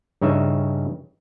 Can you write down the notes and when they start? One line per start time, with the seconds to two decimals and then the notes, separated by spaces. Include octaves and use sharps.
0.22 G2 C#3 D#4 C#5 E5